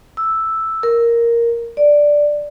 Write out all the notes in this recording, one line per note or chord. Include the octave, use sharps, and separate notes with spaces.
E6
A#4
D5